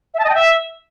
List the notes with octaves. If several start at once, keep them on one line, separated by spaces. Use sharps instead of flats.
E5
A5
D#5
G5
E5